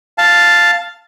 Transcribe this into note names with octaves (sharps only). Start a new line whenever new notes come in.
F5 A5